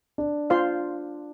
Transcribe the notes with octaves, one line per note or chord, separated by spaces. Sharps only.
D4
F4 C5 F5 C6